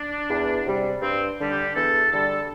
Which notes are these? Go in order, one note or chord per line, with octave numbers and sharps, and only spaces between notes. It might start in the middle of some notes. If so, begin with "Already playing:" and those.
Already playing: D4
E2
C3 G3
G2 C4
D3 G3
G4
E2 A4
D3 G3 A4